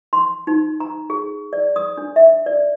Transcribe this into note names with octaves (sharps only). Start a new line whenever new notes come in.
C6
D#4
A#5
G#4
D5
D#6
D4
E5
D5